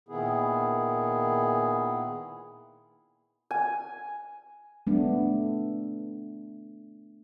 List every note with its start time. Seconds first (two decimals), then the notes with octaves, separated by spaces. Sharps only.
0.09 A#2 D#3 B3 E4 G#4
3.51 G#5
4.87 A3 B3 D4